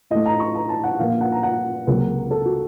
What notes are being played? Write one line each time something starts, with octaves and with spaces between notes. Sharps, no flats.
A2 A3 D#5
A#5
C#6
A#5
A5
F#5
A#2 F3 A#3 F5
F5
F#5
A#5
F#5
C#2 C3 F#3 A#3
A4
F#4